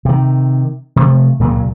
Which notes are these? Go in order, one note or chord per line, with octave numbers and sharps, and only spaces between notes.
C3 D#3
C3 F3 A3
C#2 A#2 C#3 F#3